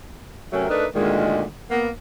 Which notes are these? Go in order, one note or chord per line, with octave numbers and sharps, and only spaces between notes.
C3 F#3 A3 C#4 A#4
A3 D4 D#4 A#4 B4
D2 A#2 D#3 G#3
A#3 B3